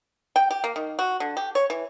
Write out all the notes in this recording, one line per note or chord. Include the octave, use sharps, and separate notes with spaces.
G5
G4
A#3
D#3
F#4
D3
G4
C#5
E3